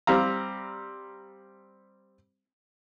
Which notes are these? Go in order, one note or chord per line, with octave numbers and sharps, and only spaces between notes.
G3 C4 F5 A#5